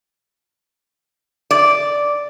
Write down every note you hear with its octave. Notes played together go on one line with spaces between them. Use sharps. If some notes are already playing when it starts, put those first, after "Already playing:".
D5